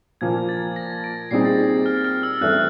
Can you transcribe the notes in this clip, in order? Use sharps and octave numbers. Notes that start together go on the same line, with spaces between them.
A#2 F3 A#3 G#6
A6
A#6
D7
A#2 G3 C4 D#4 G#4 C7
A6
F6
F6
E6
G2 E3 A3 C4 E4 F#6